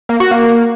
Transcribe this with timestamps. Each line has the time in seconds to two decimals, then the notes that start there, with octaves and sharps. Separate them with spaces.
0.09 A#3
0.20 F#4
0.31 A#3